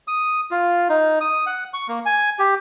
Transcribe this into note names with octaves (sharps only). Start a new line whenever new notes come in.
D#6
F4
D#4
D#6
F#5
C#6
A#3
G#5
G4